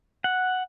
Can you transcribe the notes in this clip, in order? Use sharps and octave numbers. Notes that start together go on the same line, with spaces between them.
F#5